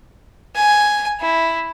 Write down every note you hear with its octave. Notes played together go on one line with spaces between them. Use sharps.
G#5
E4